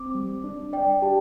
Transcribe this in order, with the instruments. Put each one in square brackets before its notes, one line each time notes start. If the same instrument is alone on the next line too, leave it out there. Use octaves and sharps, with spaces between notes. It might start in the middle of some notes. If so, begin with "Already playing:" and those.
Already playing: [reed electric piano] C4 [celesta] D6
[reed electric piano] G3
D4
[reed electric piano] D5 [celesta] G5
[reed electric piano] G4 [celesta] A5